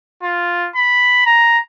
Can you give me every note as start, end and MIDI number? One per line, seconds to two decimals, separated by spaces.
0.23 0.68 65
0.76 1.22 83
1.26 1.59 82